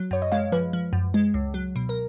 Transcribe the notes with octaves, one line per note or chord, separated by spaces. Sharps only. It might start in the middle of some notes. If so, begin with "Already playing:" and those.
Already playing: F#3
F#2 C#5
D#5
G#3 F5
F3 B4
F3
F#2
G#3
C#2
F#3
B2
A#4